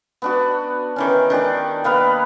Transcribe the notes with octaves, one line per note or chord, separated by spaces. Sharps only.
B3 D4 F#4
D#3 E3 C#4
D#3 D4 G4 D5
A#3 B3 B4 F5